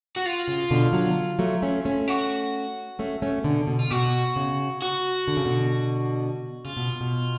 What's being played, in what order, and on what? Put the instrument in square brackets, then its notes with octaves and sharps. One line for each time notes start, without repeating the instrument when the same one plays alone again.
[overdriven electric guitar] F#4
F4
[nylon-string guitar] C#3
B2 D3
D3 F#3
F#3 A3
A3 C#4
A3 C#4
[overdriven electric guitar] F#4
[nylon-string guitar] A3 C#4
A3 C#4
B2 D3
B2
[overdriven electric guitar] F4
[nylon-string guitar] B2 [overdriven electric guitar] F#4
[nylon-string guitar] C#3
[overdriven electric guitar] F#4
[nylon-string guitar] D3
C#3
B2 D3
[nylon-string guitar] C#3 [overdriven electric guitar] F4
[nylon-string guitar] B2
B2